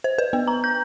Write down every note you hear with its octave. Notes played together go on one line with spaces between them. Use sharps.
C5
B4
B3
A#5
G6